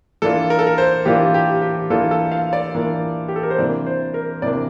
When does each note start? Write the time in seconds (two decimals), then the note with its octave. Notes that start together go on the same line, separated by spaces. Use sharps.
0.22 E3 A#3 D4 F4 A4
0.50 A#4
0.59 A4
0.67 A#4
0.78 C5
1.05 E3 A#3 D4 F4 G4
1.34 G4
1.62 G4
1.90 E3 A#3 D4 F4 A4
2.11 A4
2.32 F5
2.53 D5
2.75 E3 A#3 D4 F4
3.28 G4
3.36 A4
3.43 A#4
3.50 C5
3.58 C3 E3 A#3 D4 D5
3.86 C5
4.14 A#4
4.42 C3 E3 A#3 D4 D5